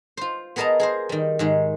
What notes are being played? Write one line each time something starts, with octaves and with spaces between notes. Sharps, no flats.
F4 C5
B3 G#4 A#4 D#5 A5 A#5
G#4 A#4 C5
D#3 G3
G#2 D#3 G#3